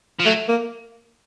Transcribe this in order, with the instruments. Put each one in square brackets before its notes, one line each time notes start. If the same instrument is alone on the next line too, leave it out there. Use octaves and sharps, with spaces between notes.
[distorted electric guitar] F3
[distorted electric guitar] F#3 [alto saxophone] A3
[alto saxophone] A#3